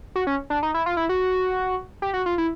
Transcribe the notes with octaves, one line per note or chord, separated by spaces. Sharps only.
F#4
C#4
D4
D#4
E4
F4
E4
F#4
G4
F#4
F4
E4